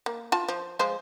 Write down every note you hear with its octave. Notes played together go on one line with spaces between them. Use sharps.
A#3
F4 A5
F3
F3 G#3 C5